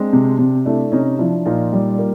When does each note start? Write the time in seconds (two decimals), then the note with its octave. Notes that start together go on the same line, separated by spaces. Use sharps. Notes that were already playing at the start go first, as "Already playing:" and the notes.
Already playing: G#3 C4 D4
0.13 C3
0.38 C3
0.65 A3 D4 E4
0.92 C3 C#4 D#4
1.19 F3 D4 E4
1.46 A#2 D#4 F4
1.73 G3
1.99 A#3